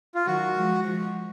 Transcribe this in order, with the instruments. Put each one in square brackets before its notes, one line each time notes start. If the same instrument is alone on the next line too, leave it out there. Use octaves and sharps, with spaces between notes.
[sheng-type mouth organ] F4
[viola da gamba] D#3 F#3 [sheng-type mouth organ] F#4
[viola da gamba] F3 G#3
F3 G#3